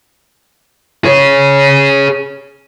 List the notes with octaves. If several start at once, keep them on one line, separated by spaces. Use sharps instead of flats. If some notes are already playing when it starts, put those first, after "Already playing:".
G#4 C#5